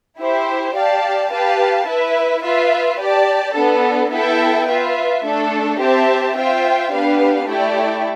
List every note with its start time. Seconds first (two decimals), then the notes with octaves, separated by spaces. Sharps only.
0.18 E4 G4 C5
0.75 G4 D5 F5 A5
1.31 G4 B4 F5 A5
1.87 E4 B4 E5
2.43 F4 B4 E5
2.99 G4 D5 A5
3.55 B3 D4 A4
4.11 B3 E4 A4 E5 G5
4.67 F4 B4 E5
5.23 A3 D4 A4
5.79 C4 G4 C5 E5 A5
6.36 F4 C5 E5 G5
6.91 B3 D4 G4 B4 F5
7.48 A3 E4 G4 D5 G5